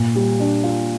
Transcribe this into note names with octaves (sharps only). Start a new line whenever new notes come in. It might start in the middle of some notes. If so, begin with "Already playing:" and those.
Already playing: A#2
G3
D4
F4